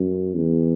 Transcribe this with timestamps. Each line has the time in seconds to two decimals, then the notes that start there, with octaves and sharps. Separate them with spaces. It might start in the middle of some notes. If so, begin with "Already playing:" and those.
Already playing: F#2
0.36 E2